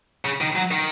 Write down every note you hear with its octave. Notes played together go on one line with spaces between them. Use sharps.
C#3
D#3
F#3
D#3